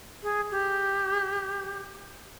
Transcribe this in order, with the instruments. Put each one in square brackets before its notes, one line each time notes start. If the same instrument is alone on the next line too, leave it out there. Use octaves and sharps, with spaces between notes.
[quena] G#4
G4